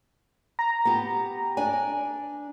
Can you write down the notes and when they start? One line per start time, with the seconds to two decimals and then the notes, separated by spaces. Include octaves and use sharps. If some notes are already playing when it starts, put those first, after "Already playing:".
0.59 A#5
0.85 B3 G4
1.57 D4 D5 G#5